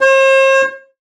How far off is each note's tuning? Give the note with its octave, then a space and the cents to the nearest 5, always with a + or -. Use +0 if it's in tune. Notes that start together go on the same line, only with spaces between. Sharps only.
C5 +45